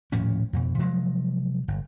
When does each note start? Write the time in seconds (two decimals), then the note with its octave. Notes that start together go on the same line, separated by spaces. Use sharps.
0.12 D#1 A2 F3 C#4
0.53 F2 B2
0.78 C3 F3 F#3 G#3
1.68 G1